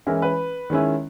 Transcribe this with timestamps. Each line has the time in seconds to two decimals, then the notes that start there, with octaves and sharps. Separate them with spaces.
0.07 E3 G#3 C#4 E4 A#4
0.22 B4
0.70 D#3 G#3 C#4 E4